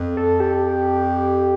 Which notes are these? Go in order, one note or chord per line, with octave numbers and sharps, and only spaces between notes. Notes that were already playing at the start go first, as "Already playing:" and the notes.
Already playing: F2
A4
G4